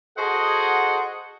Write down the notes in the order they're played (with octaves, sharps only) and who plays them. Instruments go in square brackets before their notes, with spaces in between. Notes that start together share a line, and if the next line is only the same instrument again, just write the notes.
[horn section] F#4 G#4 A4 C5 D#5 F#5